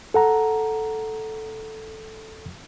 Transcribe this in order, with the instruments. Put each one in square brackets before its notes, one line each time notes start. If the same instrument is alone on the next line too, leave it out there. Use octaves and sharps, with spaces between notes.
[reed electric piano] A4 F#5 A#5